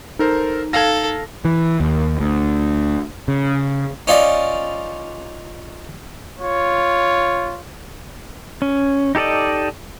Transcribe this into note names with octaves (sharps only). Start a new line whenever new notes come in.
D#4 A4 A#4 C5
A4 F5 G#6 A#6
E3
D#2
D2
C#3
C#4 D#4 F4 D5
F4 C#5
C#4
D#4 G4 A4 D5 D#5